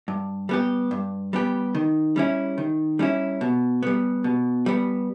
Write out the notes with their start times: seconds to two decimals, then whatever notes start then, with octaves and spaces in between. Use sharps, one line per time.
0.08 G2
0.49 G3 B3 G4
0.91 G2
1.33 G3 B3 G4
1.75 D#3
2.16 G3 C#4 E4
2.58 D#3
2.99 G3 C#4 E4
3.41 B2
3.83 G3 B3
4.24 B2
4.66 G3 B3